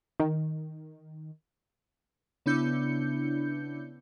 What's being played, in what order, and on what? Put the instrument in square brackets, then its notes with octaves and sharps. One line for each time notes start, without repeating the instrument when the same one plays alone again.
[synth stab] D#3
[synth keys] C#3 B3 D4 E4 G6 C#7